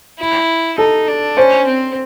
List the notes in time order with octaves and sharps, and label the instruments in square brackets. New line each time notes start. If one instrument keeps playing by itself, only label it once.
[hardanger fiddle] E4
[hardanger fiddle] D#4 [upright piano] A4
[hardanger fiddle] D4
[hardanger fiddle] C#4 [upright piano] C5
[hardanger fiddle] C4